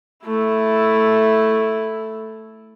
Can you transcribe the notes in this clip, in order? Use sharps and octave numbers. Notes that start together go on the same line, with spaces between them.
A3 E4